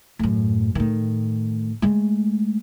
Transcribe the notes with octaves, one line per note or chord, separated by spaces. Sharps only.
F#2 A2
A2 D#3
G#3 A3